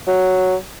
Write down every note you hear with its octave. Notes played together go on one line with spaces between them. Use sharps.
F#3